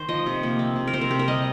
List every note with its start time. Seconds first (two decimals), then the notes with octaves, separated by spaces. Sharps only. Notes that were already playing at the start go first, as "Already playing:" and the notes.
Already playing: D#3 C5
0.08 F3 D#5
0.26 C3
0.43 A#3
0.59 C4
0.76 C3
0.87 A#4
0.94 C3 C5
1.01 A#4
1.11 C4 G4
1.19 A#4
1.28 G3 D#5